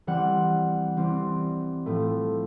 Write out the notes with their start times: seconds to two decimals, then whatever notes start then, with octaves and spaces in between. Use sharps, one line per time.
0.07 E3 G3 C4 F#5
0.97 E3 G3 C4
1.86 A2 F3 A3